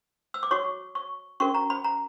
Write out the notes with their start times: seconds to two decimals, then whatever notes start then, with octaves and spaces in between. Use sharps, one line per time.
0.34 E6
0.43 D6
0.51 F#4 C#5 C#6
0.95 C#6
1.40 C#4 F#4 A#4 C#6
1.55 A#5
1.70 B5
1.84 A#5